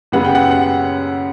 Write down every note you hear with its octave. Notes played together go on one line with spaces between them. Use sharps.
F#2 C#3 G3 B3 F#5
G5
F#5
F#5